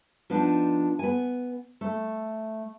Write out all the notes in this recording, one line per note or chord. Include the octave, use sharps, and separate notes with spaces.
F3 B3 D4 D#4
B3 G#5
A3